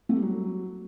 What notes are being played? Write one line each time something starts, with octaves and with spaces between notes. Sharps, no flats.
A3
G3
F#3